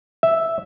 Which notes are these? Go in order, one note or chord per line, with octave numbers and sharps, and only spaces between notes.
E5